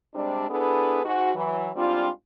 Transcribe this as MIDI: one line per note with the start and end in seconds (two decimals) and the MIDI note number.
0.14 0.49 48
0.14 0.49 55
0.14 0.49 56
0.14 0.49 60
0.14 0.49 62
0.49 1.02 59
0.49 1.02 62
0.49 1.02 64
0.49 1.02 68
0.49 1.02 69
0.49 1.02 71
1.04 1.32 44
1.04 1.32 66
1.33 1.69 52
1.33 1.69 54
1.75 2.08 44
1.75 2.08 55
1.75 2.08 60
1.75 2.08 62
1.75 2.08 65